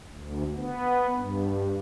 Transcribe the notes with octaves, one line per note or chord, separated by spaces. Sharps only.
D2
B3
G2